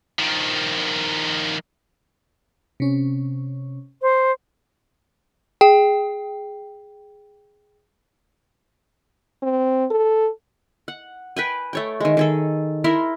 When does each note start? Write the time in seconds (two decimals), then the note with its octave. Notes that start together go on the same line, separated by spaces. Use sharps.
0.19 D#3 F3
2.80 C3 C#4
4.02 C5
5.61 G#4 G5
9.43 C4
9.91 A4
10.88 F#5
11.36 B4 G5 G#5
11.73 A3 C#5 G5
12.00 D#3 G#3
12.17 D#3 G#4 A4
12.84 E4 A#4 E5 C6